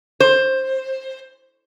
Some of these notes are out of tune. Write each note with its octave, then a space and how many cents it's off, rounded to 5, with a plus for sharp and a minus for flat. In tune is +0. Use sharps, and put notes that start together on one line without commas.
C5 +15